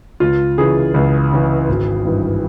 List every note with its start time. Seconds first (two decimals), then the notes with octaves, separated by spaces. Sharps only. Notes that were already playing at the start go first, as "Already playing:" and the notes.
0.20 C#2 F4
0.58 C#3 E3 G#4
0.94 C#2
1.32 C#3 E3
1.69 G#1
2.05 G2 E3